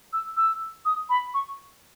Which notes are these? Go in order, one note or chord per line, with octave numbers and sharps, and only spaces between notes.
E6
E6
D#6
B5
C#6